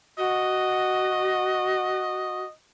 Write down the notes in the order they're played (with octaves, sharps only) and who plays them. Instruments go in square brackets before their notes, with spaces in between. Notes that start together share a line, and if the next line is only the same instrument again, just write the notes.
[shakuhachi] F#4 [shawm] D#5